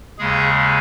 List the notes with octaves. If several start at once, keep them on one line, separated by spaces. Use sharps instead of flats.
D#2 C#3 G#3 G#4